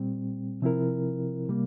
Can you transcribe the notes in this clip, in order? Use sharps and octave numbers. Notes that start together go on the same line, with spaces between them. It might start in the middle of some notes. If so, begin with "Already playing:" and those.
Already playing: A#2 G3 C4
C3 F3 C4 E4 A#4
C3 G3 A#3